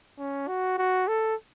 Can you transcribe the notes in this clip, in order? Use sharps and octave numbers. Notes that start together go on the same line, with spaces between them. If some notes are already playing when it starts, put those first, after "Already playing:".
C#4
F#4
F#4
A4